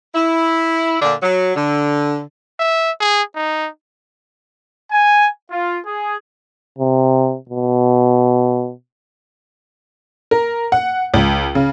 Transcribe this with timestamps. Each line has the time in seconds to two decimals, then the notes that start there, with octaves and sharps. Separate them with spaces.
0.14 E4
1.01 A#2 D3 D4
1.22 F#3
1.56 D3
2.60 E5
3.00 G#4
3.36 D#4
4.92 G#5
5.51 F4
5.86 G#4
6.79 C3
7.50 B2
10.31 A#4
10.72 F#5
11.14 C#2
11.55 C#3